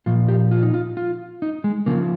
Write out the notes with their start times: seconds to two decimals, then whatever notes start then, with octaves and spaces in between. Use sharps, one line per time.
0.06 A#2 F3 F4
0.28 G4
0.51 F4
0.63 D#4
0.74 F4
0.97 F4
1.42 D#4
1.64 G#3
1.86 C#3 F3 A#3